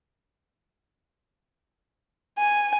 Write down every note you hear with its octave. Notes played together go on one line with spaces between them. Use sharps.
G#5